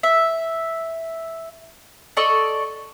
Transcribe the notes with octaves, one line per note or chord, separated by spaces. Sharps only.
E5
A4 D5 D#5 C#6